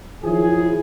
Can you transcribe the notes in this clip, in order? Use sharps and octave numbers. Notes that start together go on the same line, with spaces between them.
D#3 F3 F#3 E4 G#4